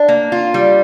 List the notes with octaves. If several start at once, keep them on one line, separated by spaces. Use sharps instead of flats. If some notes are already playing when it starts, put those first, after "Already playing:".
Already playing: D4
A#3
F4
G3